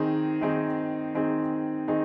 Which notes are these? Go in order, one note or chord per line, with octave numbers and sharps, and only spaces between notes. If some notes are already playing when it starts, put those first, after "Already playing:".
Already playing: D#3 C4 D#4 G#4
D#3 C4 D#4 G#4
D#3 C4 D#4 G#4
D#3 C4 D#4 G#4